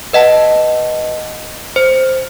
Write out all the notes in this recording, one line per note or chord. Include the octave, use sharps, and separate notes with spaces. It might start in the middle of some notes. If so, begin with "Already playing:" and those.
B4 D#5 F#5 A5
C5